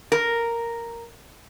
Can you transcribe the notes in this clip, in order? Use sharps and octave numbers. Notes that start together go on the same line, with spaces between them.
A#4